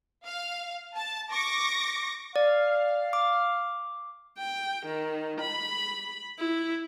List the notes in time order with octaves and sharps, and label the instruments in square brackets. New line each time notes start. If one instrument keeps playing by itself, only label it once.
[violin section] F5
A5
C#6 D6 A#6
[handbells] D5 [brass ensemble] F5
[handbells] D6
[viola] G5
D#3
B5
E4